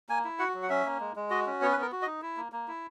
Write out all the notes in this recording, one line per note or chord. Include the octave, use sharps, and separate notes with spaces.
A#3 G#5
E4
F#4 F#5
F#3
F#5
C#4 E5
A#3
G#3
G#3
F#4 D#5
C#4
B3 C#5
B4
B3 A#4
F#4
D#5
D#4
E4
A#3
A#3
E4